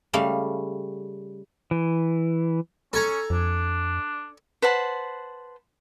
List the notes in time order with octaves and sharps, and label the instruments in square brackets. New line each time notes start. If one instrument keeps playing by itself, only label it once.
[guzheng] C#3 G3 A3 F5
[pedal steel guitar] E3
[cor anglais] C#4 [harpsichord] A4 G#5 A#5
[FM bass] F2 [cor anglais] D4
[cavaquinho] B4 C5 F#5 A5